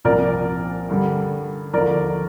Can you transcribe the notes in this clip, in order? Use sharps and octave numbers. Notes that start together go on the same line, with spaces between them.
C2 A#2 F3 A#4 D5
G2 D3 G3
D#2 D3 F3 A#4 D5